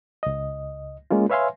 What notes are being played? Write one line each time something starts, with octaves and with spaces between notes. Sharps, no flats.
C#2 D#5
G#3 A#3 C#4 F4
B4 C#5 E5 F5 G#5 C6